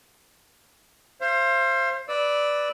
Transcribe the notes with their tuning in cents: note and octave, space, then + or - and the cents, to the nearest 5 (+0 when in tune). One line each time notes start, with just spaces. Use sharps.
C5 +20 F5 -40
B4 +0 D5 +0 E6 -20